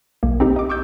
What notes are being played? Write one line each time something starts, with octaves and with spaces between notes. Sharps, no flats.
B1 A#3
C4 D#4 G4
D#5 D6
C#6 D6 E6 G6